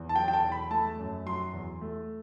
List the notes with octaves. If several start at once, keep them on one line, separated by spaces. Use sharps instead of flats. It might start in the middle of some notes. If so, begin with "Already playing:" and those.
Already playing: E2
A5
F#3 G5
G5
A5
E2
B5
A3 A5
F#2
F#3 C6
E2
A3